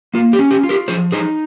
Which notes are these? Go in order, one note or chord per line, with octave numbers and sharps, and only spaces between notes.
A#3 F4
G4
C#4
G4
F4
G4 A#4
F3 G#4 C5
D#4 G#4 C5